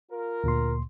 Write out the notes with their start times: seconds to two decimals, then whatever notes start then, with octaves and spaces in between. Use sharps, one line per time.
0.10 F4 A#4
0.44 D2 A#2 C6